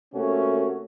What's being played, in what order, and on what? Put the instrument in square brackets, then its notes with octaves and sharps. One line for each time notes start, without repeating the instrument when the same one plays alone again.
[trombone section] C3 A3 A#3 C#4 F#4